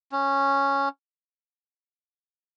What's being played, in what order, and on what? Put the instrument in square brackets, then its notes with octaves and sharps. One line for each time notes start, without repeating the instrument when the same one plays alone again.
[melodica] C#4